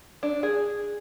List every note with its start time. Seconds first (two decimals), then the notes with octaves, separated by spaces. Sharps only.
0.23 D4
0.43 G#4